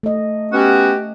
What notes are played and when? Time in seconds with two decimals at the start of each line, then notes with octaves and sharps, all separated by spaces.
0.03 A3 D#5
0.52 B3 C#4 F#4 G4